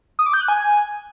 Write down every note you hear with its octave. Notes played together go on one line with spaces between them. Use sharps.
D#6
D6
G6
F#6
G#5